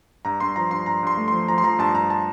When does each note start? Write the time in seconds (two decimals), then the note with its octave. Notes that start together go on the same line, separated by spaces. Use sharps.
0.25 G2 A#5
0.40 G2 C6
0.56 F3 A#5
0.71 G2 C6
0.86 G2 A#5
1.03 G2 C6
1.17 A3
1.28 F3 C6
1.48 F3 A#5
1.58 C6
1.63 F3 A#5
1.79 G2 A5
1.94 G2 A#5
2.10 A5